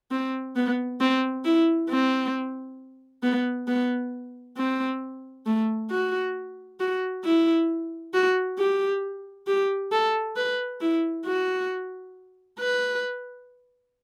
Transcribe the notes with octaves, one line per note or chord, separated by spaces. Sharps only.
C4
B3
C4
E4
C4
B3
B3
C4
A3
F#4
F#4
E4
F#4
G4
G4
A4
B4
E4
F#4
B4